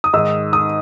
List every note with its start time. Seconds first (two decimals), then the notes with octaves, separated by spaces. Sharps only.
0.04 D#6
0.13 G#2 D#3 E6
0.53 D#6